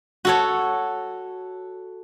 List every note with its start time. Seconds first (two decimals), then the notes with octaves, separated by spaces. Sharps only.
0.25 F#4 A4 C#5